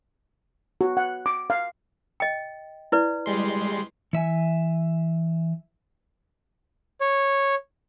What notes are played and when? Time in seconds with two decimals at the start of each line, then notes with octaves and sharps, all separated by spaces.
0.81 F#4
0.97 F#5
1.26 D6
1.50 F5
2.20 D#5 G5
2.92 E4 B4 D5
3.26 G3 G#3 C6
4.13 E3 E5 G#5
7.01 C#5